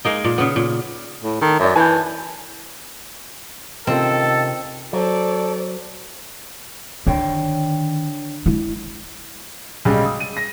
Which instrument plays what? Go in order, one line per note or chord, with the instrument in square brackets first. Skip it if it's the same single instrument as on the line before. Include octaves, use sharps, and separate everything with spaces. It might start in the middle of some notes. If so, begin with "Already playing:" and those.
[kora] G#3 A#3 D#4
A#2
C#3 B3
A#2
[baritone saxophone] A2
[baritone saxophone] D#3 [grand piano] A4
[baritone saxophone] F#2 [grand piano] D5 E5
[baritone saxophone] E3 [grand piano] G#5 A5 G6
[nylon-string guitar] C3 C#4 F4 [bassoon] D#3 [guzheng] C4 [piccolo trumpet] A4
[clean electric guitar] F#3 [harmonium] A4 [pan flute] C5 [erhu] D5
[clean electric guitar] D3 C#5 G5 [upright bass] D#3
[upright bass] G#3 E4
[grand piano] B1 C#3 G3 G#3
D#6
D#7
A#6